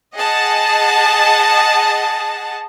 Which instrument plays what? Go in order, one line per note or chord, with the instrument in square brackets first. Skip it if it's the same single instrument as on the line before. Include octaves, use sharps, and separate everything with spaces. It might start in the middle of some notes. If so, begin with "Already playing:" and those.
[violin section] G#4 D#5 F#5 A5